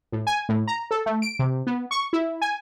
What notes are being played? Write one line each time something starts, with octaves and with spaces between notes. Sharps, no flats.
A2
G#5
A2
A#5
A4
A3
D7
C3
B3
C#6
E4
G#5